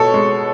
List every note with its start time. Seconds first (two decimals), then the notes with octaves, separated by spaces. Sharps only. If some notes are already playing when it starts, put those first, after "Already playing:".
Already playing: B2 B3 A4 C#5
0.14 G#3